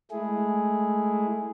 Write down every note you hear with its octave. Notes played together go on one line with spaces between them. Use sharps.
G#3 A3 E4 G#4